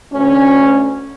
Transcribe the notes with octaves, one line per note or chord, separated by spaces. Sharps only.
D2 C#4